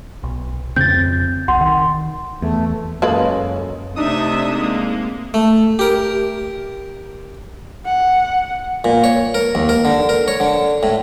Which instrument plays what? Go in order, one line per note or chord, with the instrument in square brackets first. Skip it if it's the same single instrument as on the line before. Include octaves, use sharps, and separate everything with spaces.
[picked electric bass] B1
[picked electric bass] F2 C#3 C4 [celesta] G6 A6
[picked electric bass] B1 [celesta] F#5 C6
[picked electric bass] D#3
[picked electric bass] E2 [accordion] A3
[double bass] F#2 C#4 [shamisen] G#3 A#3 B4 [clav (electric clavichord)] A4 D#5
[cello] C3 [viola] A3 E5 [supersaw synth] D4 D#4 D#6
[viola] G#3 A#3
[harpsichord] A3
G4 A#4
[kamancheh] F#5
[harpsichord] A#2
C#5
A#4
D#2
A#4
D3
A#4
C#5
D3
A2